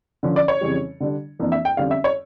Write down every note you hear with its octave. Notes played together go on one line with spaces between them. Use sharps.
D3 F3 C#4
D5
C#5
F2 C#3 E3 G3
D3 G3 D4
F2 E3 A#3 D4
E5
G5
F2 D3 G3 C#4 F5
E5
C#5